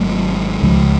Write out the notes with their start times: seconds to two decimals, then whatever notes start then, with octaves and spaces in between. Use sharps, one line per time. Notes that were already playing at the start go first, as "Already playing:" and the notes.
Already playing: G#1 G#2 F#3 A3
0.63 C#2 C#3 F3 G#3